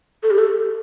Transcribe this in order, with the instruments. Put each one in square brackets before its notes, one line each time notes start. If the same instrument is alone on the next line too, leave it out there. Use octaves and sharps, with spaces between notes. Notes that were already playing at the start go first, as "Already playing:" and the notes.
[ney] A4
G4
A4